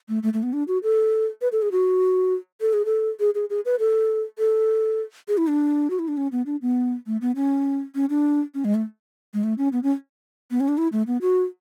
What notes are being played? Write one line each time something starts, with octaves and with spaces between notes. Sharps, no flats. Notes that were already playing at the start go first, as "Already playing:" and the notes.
A3
A3
A3
B3
D4
F#4
A4
B4
A4
G#4
F#4
A4
G#4
A4
G#4
G#4
G#4
B4
A4
A4
G#4
E4
D4
F#4
E4
D4
C#4
B3
D4
B3
A3
B3
C#4
C#4
D4
C#4
G#3
A3
G#3
A3
C#4
B3
C#4
B3
C#4
D4
E4
A3
B3
F#4